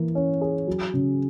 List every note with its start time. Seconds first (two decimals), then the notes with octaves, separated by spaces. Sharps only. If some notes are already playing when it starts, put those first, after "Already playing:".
Already playing: E3 A#3
0.15 C#4
0.41 G#4
0.67 F#3
0.93 C#3